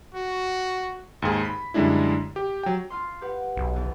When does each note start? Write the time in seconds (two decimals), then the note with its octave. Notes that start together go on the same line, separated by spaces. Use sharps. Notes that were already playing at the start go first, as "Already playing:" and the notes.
0.15 F#4
1.22 D#2 G#2 G#4
1.43 B5 B6
1.74 F#2 D3 G3 G#3 D4 E4
2.36 G4
2.63 F#3 G5
2.90 F4 F5 C6
3.21 G4 B4 F#5
3.57 B1
3.73 F#2 B2 E3